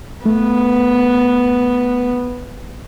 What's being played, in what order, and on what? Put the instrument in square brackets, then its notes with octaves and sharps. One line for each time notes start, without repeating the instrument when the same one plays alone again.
[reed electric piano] A3 [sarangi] B3